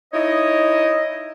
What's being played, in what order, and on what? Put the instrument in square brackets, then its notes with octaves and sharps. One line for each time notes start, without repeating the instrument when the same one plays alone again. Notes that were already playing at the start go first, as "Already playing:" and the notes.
[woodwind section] D#4 E4 C#5 D#5